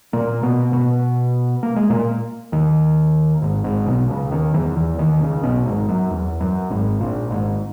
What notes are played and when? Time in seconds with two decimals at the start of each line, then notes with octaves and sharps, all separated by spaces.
0.13 A#2 A#3
0.43 B2 B3
0.73 B2 B3
1.63 A#3
1.76 G#3
1.90 A#2 A#3
2.52 D#2 D#3
3.42 G#1 G#2
3.64 G#1 G#2
3.87 B1 B2
4.09 C#2 C#3
4.31 D#2 D#3
4.54 E2 E3
4.76 E2 E3
4.98 D#2 D#3
5.21 C#2 C#3
5.43 B1 B2
5.66 G#1 G#2
5.89 F#2
6.11 E2
6.41 F#2
6.70 G#1 G#2
7.00 A#1 A#2
7.30 G#1 G#2